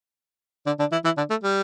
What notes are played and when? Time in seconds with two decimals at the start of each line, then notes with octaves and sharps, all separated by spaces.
0.66 D3 D4
0.79 D3 D4
0.92 E3 E4
1.05 E3 E4
1.17 D3 D4
1.30 A3
1.43 G3